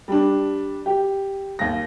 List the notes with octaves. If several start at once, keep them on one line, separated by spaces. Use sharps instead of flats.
G3 D4
G4
D#2 A#6